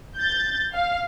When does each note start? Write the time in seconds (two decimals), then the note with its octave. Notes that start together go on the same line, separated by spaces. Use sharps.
0.18 G6 A6
0.74 F5